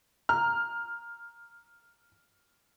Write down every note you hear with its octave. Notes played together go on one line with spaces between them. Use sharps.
A#5 F6